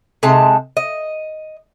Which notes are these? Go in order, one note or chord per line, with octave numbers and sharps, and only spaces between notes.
C3 G#3 D#4 A5
D#5